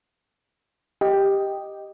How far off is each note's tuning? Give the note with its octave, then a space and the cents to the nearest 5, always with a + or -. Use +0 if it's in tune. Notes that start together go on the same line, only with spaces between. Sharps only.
G4 +5 D#5 +0 G5 +0